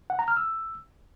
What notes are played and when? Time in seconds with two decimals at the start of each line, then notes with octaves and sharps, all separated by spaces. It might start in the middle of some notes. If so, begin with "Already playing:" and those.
0.10 F#5
0.19 A#5
0.28 F6
0.37 E6